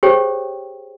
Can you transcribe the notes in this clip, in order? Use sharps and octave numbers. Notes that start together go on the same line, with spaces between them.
G4 G#4 C5 C#5 G5